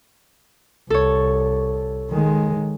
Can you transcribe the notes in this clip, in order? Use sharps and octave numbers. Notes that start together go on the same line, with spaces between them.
C2 A4 C#5
D#3 G#3